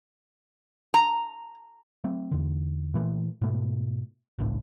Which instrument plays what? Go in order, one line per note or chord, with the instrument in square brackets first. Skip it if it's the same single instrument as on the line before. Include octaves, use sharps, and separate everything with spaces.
[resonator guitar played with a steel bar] A#5
[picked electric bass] F#3 A3 C4
E2 D3
A#2 E3 A3
G#2 B2 A3
G#1 C#2 A2 D4